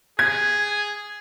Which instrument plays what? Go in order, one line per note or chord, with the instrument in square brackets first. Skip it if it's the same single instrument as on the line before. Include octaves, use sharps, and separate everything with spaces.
[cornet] G#4 [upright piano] G#6